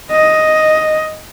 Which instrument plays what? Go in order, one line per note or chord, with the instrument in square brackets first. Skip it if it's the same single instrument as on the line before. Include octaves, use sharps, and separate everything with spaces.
[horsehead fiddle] D#5